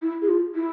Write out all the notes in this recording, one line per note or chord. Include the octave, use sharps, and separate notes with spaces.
E4
G#4
F4
E4